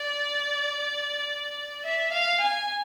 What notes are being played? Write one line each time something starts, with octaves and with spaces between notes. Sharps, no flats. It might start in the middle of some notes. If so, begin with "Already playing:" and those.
Already playing: D5
E5
F5
G#5